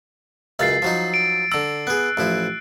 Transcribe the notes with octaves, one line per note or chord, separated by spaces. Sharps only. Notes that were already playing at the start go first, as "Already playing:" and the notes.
C#2 F#2 F5 E6 A6 C7
F3 F#3 D#4
D7
D3 A#5 E6
B3 G#4 F#6
A1 F3 E4